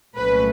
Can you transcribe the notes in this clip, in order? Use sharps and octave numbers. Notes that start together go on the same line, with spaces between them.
C2 A#2 F#3 A3 C#4 B4